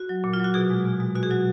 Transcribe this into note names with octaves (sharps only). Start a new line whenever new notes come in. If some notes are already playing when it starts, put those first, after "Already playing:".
Already playing: F#4
F#3
A#2
F4
F#3
F#4
B2 G#4
G#3
B2
G#3
B2 F#4
G#4
F#3 F#4